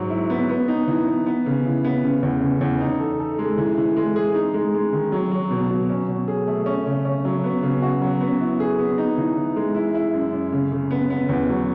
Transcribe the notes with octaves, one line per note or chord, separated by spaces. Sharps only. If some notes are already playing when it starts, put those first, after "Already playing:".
Already playing: G#2 F#3
E4
B3
B3
D#4
E3
B3
B3
C#3
E3
B3
C#3
E2
C#3
E2
D#4
A4
A4
G#3
E3
E3
G#3
G#4
D#4
G#3
G#3
D#3
F#3
F#3
B2
F#3
C#4
B2
G#4
A3
C#4
C#3
C#4
F#3
B3
C#3
F#4
F#3
B3
E4
G#4
B3
D#4
E3
E3
G#3
E4
E4
F#2
F#2
C#3
C#3
B3
B3
E2
F#3